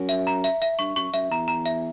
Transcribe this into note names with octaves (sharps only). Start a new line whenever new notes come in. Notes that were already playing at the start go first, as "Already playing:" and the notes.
Already playing: F#2
E5
A#5
E5
E5
G2 C#6
F#2 C#6
F#2 E5
E2 A#5
A#5
E5